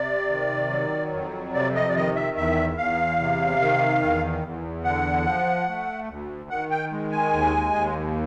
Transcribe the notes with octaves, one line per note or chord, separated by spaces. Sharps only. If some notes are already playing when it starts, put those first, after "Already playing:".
Already playing: C3 D5
D#3
F#3
F2
C3 D5
D#5
D5
D#3 D#5
E5
E2 E5
E2 F5
C3
D#3
E2
E2
D3 F#5
F3
A3
D2
D#3 F#5
G5
G#3
G#5
D#2
D#2